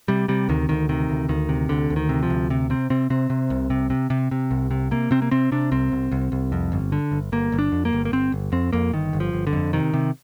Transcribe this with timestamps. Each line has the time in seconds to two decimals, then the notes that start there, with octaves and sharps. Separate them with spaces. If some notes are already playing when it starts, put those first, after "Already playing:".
0.08 C3 G3
0.28 C3 G3
0.49 D2 D#3
0.69 D2 D#3
0.89 C3 D#3
1.10 D2
1.29 D2 D#3
1.49 C3
1.69 D2 D3
1.90 D2
1.96 D#3
2.09 C3
2.23 F3
2.30 D2
2.50 C3
2.70 C3 C4
2.90 C3 C4
3.10 C3 C4
3.30 C3
3.50 C2
3.70 C3
3.90 C3
4.10 C3
4.31 C3
4.51 C2
4.71 C3
4.91 C3 A#3
5.11 C3 C4
5.22 A#3
5.31 C3 C4
5.52 C3 D4
5.71 C2 C4
5.92 C2
6.12 C2
6.32 C2
6.52 F2
6.72 G1
6.92 D3
7.12 G1
7.32 G1 A#3
7.52 G1
7.59 D4
7.72 F2
7.85 A#3
7.93 G1
8.05 A#3
8.12 G1 C4
8.32 G1
8.52 F2 C4
8.73 F2 A#3
8.93 G1 D#3
9.13 G1
9.20 F3
9.33 G1
9.47 D3
9.53 F2
9.73 C3 D#3
9.94 C3